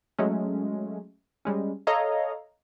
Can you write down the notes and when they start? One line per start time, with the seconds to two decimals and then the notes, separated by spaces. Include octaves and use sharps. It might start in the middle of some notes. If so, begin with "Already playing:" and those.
0.19 F#3 G#3 A3 C#4
1.45 G3 G#3 C#4
1.87 A4 C#5 D#5 F5 A#5